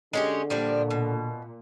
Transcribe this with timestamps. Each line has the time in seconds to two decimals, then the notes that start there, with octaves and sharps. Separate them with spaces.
0.13 D3 G#3 C#4 G4
0.50 A#2 F3 G3 D4
0.90 B2